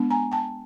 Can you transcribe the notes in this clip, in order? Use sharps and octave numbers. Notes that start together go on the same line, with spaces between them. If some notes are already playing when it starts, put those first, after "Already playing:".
Already playing: G#3 B3 D4
G#5 A#5
G5 A5